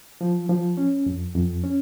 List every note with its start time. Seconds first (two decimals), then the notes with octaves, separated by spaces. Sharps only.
0.21 F3
0.49 F3
0.77 C#4
1.06 F2
1.35 F2
1.64 C#4